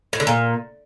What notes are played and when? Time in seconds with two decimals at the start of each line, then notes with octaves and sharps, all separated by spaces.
0.13 A2
0.20 D3
0.27 A#2